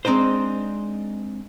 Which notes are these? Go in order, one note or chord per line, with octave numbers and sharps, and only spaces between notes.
G#3 C4 D4 D#4 C5